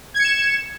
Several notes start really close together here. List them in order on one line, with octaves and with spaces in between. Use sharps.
G#6 C#7 E7